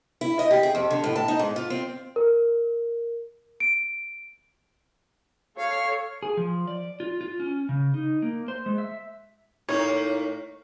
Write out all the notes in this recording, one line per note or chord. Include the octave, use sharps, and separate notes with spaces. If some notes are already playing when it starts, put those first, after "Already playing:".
E4
D#5
G4
G#4
F2
D3
A2
A5
D#4
G#2
F4
C4
A#4
D7
A4 C#5 F5
G#4
F3
D5
F4
F4
C#4
C#3
D#4
A#3
C5
G#3
E5
A2 A#3 D#4 C#5